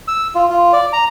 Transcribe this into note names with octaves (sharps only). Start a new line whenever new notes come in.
E6
F4
F4
D5
A#5